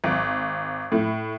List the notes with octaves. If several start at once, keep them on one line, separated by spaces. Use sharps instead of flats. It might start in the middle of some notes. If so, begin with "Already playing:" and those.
G#1
A2